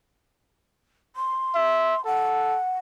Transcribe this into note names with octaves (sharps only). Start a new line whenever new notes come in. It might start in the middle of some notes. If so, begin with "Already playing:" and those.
C6
E5
A4 F#5